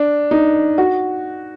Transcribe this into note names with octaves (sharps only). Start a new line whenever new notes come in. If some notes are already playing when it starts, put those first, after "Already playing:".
Already playing: D4
D#4
F#4